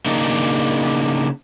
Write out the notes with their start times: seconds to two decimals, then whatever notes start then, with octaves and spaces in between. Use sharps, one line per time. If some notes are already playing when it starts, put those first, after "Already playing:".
0.06 C#3 A#3 D4 D#4